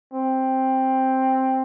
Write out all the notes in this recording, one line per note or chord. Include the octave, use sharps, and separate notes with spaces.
C4